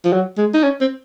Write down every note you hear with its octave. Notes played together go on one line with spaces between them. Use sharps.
F3
F#3
G#3
D#4
C#4
C4